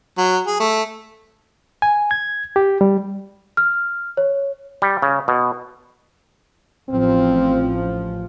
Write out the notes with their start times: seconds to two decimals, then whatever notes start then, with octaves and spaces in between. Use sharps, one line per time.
0.18 F#3
0.47 G#4
0.60 A3
1.82 G#5
2.11 G#6
2.56 G4
2.81 G3
3.57 F6
4.17 C#5
4.82 G3
5.02 C#3
5.28 B2
6.90 A1 F3 C4